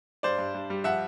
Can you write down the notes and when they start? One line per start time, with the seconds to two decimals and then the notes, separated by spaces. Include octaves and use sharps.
0.23 G2 C5 D5
0.38 G2
0.54 G2
0.70 G3
0.84 F3 E5 F#5